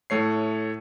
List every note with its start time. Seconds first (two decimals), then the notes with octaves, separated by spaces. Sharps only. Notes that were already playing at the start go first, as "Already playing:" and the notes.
0.10 A2 A3 C#5 C7